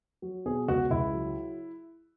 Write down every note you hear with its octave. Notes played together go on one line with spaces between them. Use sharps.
F#3
B2 G#4
C#2 F#4
C#2 E4
F#3